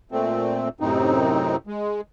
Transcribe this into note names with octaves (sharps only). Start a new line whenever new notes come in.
A#2 A3 C4
F#2 A2 C3 C4 D#4
G#3